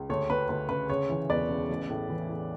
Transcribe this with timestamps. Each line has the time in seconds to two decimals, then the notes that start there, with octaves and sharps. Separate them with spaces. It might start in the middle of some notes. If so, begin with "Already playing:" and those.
Already playing: C#2
0.10 D2 C#5
0.30 D2 B4
0.49 D2 B4
0.69 C#3 B4
0.89 C#3 C#5
1.09 E3
1.30 E1 B4 D5
1.49 C#3
1.69 A1
1.90 A2
2.10 E3
2.29 A2